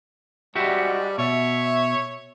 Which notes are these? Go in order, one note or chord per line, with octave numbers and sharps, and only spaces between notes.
G#2 G3 D4 F#4 G4 E5
B2 C#5 E5